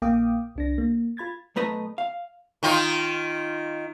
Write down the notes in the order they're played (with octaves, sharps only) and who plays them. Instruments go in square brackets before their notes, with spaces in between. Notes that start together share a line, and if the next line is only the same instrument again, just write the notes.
[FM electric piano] A#1 A#3 F5 G5 D6 D#6
C2 D4 A#6
A#3
F4 B5 G#6 A6
[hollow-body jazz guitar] B1 A3 B4 D#5 A#5
F5
[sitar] D#3 D#4 F4